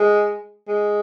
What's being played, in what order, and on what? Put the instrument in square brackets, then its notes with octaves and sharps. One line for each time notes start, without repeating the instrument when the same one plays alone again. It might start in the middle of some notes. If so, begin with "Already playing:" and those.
Already playing: [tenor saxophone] G#3
G#3